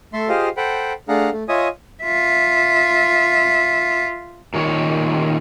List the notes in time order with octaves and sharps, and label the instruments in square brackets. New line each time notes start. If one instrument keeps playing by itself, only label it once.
[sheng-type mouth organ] A3 A4 E5 C6
F4 G4 G#4 C5 D#5 F5
A4 C5 F#5 G5 B5
A3 D4 G#4 F5 F#5 A#5
A3
F4 C#5 D#5 E5 G#5 D#6
[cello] F4 E5
[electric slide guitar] A#2 D#3 C#5